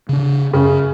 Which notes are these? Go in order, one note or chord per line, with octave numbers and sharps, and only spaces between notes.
C#3 D4
F#2 C#3